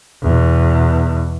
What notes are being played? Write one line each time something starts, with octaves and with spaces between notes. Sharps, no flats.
E2 B2